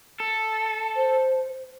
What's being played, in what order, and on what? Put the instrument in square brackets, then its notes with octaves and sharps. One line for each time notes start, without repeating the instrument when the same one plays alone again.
[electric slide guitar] A4
[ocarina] C5